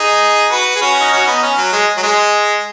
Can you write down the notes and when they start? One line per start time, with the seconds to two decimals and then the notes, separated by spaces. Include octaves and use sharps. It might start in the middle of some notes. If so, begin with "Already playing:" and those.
Already playing: D#4 G#4
0.51 F#4 B4
0.76 G#4
0.81 C#4 F#4
1.01 D#4
1.12 C#4 F#4
1.27 B3 D#4
1.42 C#4
1.57 F#3
1.73 G#3
1.97 F#3
2.03 G#3